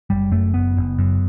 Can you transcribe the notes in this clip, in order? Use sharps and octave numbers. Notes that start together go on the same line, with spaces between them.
F#1 G3
F#2 A3
F#1 B3
F#1
F#2